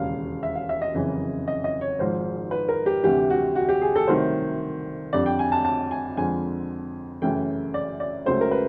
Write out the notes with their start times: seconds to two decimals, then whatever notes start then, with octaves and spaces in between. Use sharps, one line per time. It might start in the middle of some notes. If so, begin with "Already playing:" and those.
Already playing: E1 D#2 C#3 F5
0.43 E5
0.55 F5
0.69 E5
0.82 D#5
0.94 F#1 F2 C#3 E3
1.48 D#5
1.64 D#5
1.81 C#5
1.99 G#1 G#2 F3 C5
2.51 B4
2.69 A#4
2.86 G4
3.03 D2 C3 E3 G3 G4
3.30 F#4
3.56 F#4
3.69 G4
3.81 G#4
3.96 A4
4.07 C2 C3 D#3 F#3 A3 C5
5.13 F2 D3 G3 D5
5.26 G5
5.39 G#5
5.52 A5
5.65 A5
5.91 G#5
6.17 F2 D3 F3 G#3 G#5
7.22 F#2 C#3 E3 A3 G5
7.74 D5
8.00 D5
8.26 C#2 C#3 F#3 A3 C5
8.41 A#4
8.51 B4